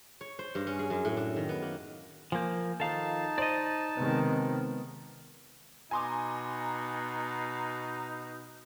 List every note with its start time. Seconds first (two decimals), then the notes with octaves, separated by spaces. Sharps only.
0.21 C#5
0.39 C5
0.55 G2
0.67 C#4
0.79 G#4
0.90 F#2
1.05 A2
1.17 D4
1.36 D#3
1.49 B3
1.62 A#3
2.32 F3 A#3 G#5 G6
2.80 D#3 F3 D#4 A4 F5 A5
3.38 C5 D5 D#5
3.97 C3 D#3 G#3 B3
5.91 B2 D#4 G#5 A#5 C6 D6